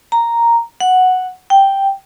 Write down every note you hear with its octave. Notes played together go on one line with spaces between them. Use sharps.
A#5
F#5
G5